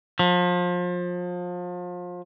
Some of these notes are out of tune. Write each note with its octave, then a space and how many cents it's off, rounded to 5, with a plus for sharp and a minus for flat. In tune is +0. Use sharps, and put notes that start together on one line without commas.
F3 +30